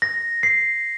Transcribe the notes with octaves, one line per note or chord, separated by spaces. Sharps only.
A#6
C7